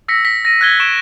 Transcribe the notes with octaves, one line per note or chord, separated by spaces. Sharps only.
E6 A#6 B6 C#7
B6
A#6 D#7
F#6 G#6 G7
C#6 D7 E7